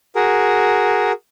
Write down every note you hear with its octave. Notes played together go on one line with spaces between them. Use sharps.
F#4 G#4 A#4